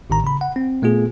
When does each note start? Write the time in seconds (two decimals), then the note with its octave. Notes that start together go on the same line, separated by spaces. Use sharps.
0.10 A1 A2 D#3 A#5
0.24 C#3 B5
0.41 F#5
0.56 C4
0.82 A#2 A3 B3 F4 G#4